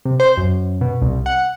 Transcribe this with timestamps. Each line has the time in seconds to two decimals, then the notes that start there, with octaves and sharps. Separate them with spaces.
0.05 C3
0.20 C5
0.37 F#2
0.81 B2
1.02 C2
1.26 F#5